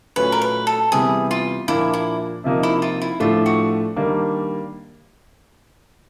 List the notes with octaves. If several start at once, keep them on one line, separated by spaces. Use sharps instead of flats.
A#2 F#3 A3 C#4 B4
A#4
B4
A4
C3 E3 G3 B3 G#4
F4
A#2 F3 A#3 D4 E4
E4
C3 F3 A#3 D#4
E4
F4
E4
A2 F3 A3 D4 F4
F#4
D#3 G3 A#3 D4